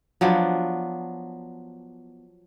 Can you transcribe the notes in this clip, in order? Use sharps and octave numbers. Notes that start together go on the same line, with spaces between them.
F3 F#3 B3 D4